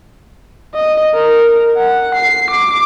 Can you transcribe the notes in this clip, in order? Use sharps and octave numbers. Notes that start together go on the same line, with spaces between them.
D#5
A#4
F#5
C7
D6